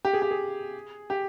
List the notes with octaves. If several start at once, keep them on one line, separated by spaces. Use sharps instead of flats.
G4
G#4
G4
G#4
G4